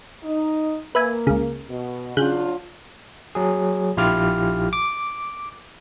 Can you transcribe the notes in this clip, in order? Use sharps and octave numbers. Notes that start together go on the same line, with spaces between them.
D#4
A#3 B4 E5 G#5
C#2 C#3
B2
C#3 F#3 D4 F4 F#6 G6
F#3 G#4
A#1 E4 F4 G4 F6
D6